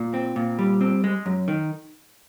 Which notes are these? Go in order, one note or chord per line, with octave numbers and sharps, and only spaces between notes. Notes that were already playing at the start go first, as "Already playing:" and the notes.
Already playing: A#2
C4
A#2
G3
C4
G#3
F#2
D#3